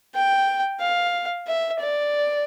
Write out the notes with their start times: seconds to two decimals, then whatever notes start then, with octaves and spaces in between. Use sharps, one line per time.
0.15 G5
0.80 F5
1.47 E5
1.80 D5